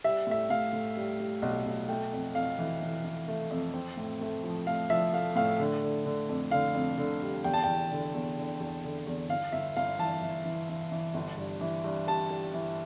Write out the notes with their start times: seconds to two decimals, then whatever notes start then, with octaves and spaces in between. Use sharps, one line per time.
0.04 G3 E5
0.27 A2 E5
0.50 A2 F5
0.73 A2
0.97 G3
1.20 G3
1.42 B1
1.66 B1
1.89 A3 G5
2.13 F2
2.35 F2 F5
2.59 E3
2.82 E3
3.04 E3
3.28 A3
3.51 F2
3.74 C4
3.97 A2
4.21 A3
4.44 F3
4.67 A3 F5
4.90 F3 E5
5.13 A3 F5
5.36 A2 F5
5.60 D3
5.83 D3
6.05 D3
6.29 F2
6.51 D3 F5
6.75 F2
6.98 D3
7.22 G3
7.44 E2 G5
7.54 A5
7.64 E2 G5
7.91 D3
8.14 E2
8.38 D3
8.60 E2
8.84 D3
9.07 E2
9.29 G1 F5
9.52 G1 E5
9.77 G1 F5
9.99 E3 A5
10.22 E3
10.45 E3
10.69 E3
10.92 E3
11.14 G1
11.37 G2
11.61 E3
11.84 G2
12.07 G3 A5
12.30 G3
12.54 E3